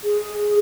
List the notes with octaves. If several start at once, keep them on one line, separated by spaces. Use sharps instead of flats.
G#4